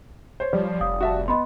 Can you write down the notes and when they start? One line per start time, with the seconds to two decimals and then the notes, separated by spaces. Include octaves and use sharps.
0.40 C5 C#5
0.53 F3 G3
0.81 F1 F5 D#6
1.00 F#4 E5 A5
1.28 B3 D#5 B5 C6